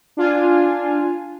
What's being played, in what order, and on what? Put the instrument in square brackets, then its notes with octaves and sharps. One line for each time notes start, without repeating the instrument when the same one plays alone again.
[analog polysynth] D4 F4 G#5